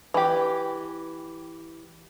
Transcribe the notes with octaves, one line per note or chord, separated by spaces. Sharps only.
E3 G4